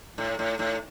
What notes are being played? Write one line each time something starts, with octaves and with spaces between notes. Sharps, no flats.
A2
A2
A2